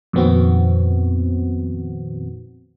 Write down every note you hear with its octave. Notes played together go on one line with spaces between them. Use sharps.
F2 A#2 D#3 B3 C4 F#4